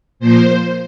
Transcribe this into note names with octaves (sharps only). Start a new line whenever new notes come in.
A#2 F3 A#3 C5